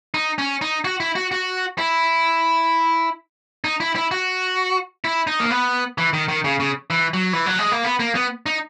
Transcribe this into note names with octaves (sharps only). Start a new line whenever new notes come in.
D#4
C#4
D#4
F#4
E4
F#4
F#4
E4
D#4
E4
E4
F#4
E4
D#4
A#3
B3
E3
D#3
D#3
C#3
C#3
E3
F#3
E3
F#3
G#3
A#3
B3
A#3
B3
D#4